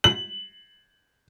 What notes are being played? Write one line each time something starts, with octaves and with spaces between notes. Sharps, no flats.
F#7